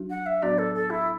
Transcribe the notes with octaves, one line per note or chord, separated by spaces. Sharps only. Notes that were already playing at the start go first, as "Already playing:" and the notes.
Already playing: F#3 D4 F#4
F#5
E5
A2 F#3 B3 D4 F#4 D5
A4
A4
E4